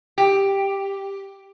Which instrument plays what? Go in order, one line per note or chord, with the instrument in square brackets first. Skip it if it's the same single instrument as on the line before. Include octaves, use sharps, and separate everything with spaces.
[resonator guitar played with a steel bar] G4